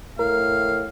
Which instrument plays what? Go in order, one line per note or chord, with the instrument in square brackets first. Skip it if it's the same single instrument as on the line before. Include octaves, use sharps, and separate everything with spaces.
[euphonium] A2 [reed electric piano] A#4 [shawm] F5